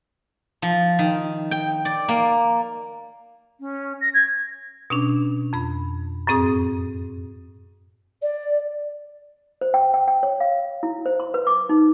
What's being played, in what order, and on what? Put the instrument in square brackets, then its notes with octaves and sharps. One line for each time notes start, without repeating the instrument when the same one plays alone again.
[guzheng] F3
D#3
G5
D5
A#3
[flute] C#4
A#6
G#6
[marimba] B2 C#4 D4
F2 B5
F#2 A2 C4 G#4 D#6
[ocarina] D5
[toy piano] C5
G5
G5
G5
C#5
F5
E4
C5
C6
B4
D6
D#4